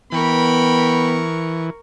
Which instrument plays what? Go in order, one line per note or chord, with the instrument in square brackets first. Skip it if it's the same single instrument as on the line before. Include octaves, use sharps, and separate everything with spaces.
[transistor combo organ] E3 [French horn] B3 [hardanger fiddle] A#4 C#6 [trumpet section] G5 B5